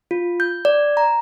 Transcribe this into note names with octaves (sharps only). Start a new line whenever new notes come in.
F4
G6
D5
A#5